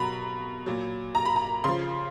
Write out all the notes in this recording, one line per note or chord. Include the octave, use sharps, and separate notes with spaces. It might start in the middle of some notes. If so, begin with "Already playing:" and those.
Already playing: B2 F#3 A#5 B5
A#2 F#3
A#5
B5
A#5
C#3 F3 C6